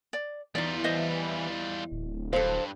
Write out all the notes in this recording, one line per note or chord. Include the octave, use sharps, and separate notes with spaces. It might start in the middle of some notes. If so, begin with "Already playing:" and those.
D5
E2 E3 G3 D#4 F4 D5
C5 D#5 E5
D1
G2 A4 C5 F5